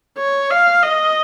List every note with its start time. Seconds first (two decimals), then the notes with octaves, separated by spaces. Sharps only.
0.18 C#5
0.51 F5
0.83 D#5